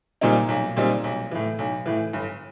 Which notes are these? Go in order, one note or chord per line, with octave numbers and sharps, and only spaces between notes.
A#2 G3 C4 D#4
B1
A#2 G3 C4 D#4
B1
A2 E3
B1
A2 E3
G1